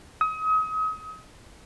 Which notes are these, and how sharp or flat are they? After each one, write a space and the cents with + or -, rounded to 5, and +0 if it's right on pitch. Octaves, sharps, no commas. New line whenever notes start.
D#6 +35